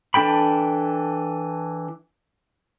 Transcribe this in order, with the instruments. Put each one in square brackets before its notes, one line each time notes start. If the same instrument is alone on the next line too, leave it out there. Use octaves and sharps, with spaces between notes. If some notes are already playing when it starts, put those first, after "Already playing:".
[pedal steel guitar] E3 D4 A4 G5 B5